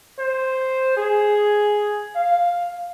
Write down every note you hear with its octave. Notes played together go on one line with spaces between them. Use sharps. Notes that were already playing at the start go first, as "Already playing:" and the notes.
C5
G#4
F5